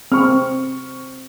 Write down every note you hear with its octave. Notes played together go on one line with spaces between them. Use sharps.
C4 C#6 F6